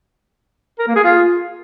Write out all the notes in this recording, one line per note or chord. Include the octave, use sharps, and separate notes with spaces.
A#4
A#3
G#4
F4